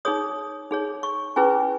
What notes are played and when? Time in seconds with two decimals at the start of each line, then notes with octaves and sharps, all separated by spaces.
0.05 D#4 G#4 C#5 D#6
0.71 D#4 G#4 C#5
1.03 C#6
1.36 C#4 E4 G#4 B4 G#5